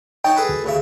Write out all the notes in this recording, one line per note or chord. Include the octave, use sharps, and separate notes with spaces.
D#4 C#5 G5 A5
G#4 A4 B4
D2
A1 C#3 E5